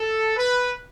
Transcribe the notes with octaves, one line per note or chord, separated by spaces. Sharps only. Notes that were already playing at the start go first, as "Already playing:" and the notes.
Already playing: A4
B4